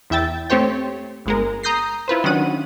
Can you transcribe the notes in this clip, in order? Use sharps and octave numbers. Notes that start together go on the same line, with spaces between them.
E2 E4 E5 G5 A6
A3 C4 G4 C5 C#5 G5
G1 G#3 A#4
A#5 D#6 G6 A#6 C7
E4 F4 B4 C5
D#3 F#3 C#4 D4 F#5 D#7